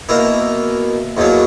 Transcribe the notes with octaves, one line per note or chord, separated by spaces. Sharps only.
B2 A#3 E4 A#4
E2 B2 F#3 A#3